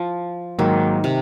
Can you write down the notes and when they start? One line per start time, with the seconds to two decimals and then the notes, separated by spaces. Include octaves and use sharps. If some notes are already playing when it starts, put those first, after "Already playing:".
Already playing: F3
0.58 G#2 D#3 F#3 A#3
1.04 C3